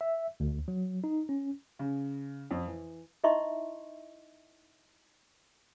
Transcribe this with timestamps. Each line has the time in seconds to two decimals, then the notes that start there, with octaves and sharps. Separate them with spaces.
0.01 E5
0.40 D2
0.68 F#3
1.04 D#4
1.29 C#4
1.79 C#3
2.51 F2
2.67 E3
3.24 D#4 E4 D#5 E5 C6 C#6